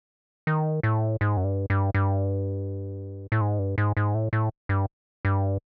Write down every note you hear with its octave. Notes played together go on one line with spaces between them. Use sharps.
D#3
A2
G#2
F#2
G2
G2
G2
A2
G#2
G2
G#2
G#2
A2
A2
G2
G2